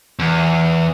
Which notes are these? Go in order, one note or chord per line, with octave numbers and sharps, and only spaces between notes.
E2